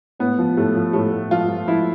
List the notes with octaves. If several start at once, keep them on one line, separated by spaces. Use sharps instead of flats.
A2 B3
F3
A2 A3
F3
A2 A3
A2
F3 F4
F3
F3 E4